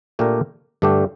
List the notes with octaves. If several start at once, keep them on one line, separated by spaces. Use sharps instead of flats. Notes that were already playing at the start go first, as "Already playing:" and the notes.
A#2 A3 D4 G4 A#4
G2 D3 A3 D4 G4